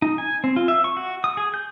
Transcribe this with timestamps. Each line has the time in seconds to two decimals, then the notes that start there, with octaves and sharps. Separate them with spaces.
0.02 D#4
0.18 G#5
0.44 C4
0.56 F4
0.68 E5
0.84 C#6
0.97 F#4
1.24 D#6
1.37 G#4
1.54 G6